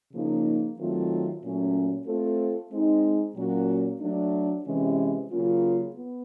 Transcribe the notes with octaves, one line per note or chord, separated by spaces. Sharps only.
C#3 F3 A#3 D#4
D#3 F#3 A3 C4 F4
A#2 F#3 A3 C#4
A3 C4 F4 A4
G#3 C4 D#4
A#2 F#3 A#3 C#4 F#4
F#3 A3 D4
C3 E3 G#3 C#4
C#3 F#3 A#3 C#4 F4
B3